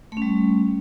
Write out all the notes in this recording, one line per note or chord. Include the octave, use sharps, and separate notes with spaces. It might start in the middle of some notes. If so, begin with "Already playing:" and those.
G3 A3 C#4